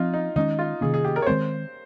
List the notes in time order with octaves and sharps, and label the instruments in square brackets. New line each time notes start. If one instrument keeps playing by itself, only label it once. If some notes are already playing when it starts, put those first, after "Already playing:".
Already playing: [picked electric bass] F3 C4 [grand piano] D#4 F4
[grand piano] D#4
[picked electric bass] D#3 G#3 C#4 [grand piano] D#4
[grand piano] F4
[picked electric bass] C3 D#3 A#3 C#4 [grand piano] G#4
[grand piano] G#4
G4
A#4
C#5
[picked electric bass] D#3 G#3 C4 [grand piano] C5